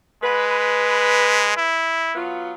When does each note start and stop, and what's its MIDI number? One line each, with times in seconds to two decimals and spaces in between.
0.23 1.54 56
0.23 1.71 71
1.57 2.16 64
2.15 2.53 54
2.15 2.53 59
2.15 2.53 65